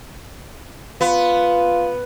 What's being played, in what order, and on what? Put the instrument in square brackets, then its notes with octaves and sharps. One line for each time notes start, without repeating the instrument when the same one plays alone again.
[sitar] B3 [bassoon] F4